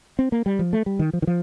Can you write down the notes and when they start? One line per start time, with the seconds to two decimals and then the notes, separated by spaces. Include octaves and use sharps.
0.19 C4
0.32 A#3
0.46 G3
0.59 F3
0.73 A3
0.86 G3
0.99 D#3
1.13 F3
1.22 D#3
1.27 F3